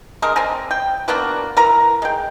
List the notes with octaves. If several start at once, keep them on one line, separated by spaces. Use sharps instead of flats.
G#3 D4 A#4
C4 G#5 A#5
G5
A#3 B3 D4 F#4
E3 A#4 A#5
G#3 G5